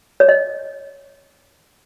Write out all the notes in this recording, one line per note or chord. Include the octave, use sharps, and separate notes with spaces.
C#5
D#5